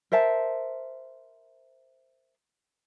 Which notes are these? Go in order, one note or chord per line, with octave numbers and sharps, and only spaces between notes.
A#4 C5 E5 A5